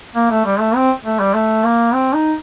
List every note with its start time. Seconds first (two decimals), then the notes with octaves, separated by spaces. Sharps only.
0.16 A#3
0.31 A3
0.46 G3
0.60 A3
0.76 C4
1.05 A3
1.20 G3
1.35 A3
1.64 A#3
1.94 C4
2.14 D#4